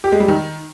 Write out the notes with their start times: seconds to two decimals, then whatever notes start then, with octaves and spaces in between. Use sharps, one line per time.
0.04 G4
0.12 G#3
0.20 G3
0.28 D#3